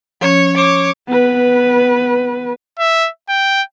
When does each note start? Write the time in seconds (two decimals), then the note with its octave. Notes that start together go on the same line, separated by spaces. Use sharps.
0.21 F3 C#4 C#5
0.56 C#5 D6
1.08 B3 B4
2.79 E5
3.29 G5